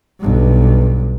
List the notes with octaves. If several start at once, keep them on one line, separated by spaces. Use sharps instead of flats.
B1 G2